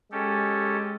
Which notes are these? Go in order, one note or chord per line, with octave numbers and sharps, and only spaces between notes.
G#3 C#4 G4 A4